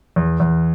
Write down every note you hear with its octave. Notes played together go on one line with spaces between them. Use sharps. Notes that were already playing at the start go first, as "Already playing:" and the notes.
E2
E2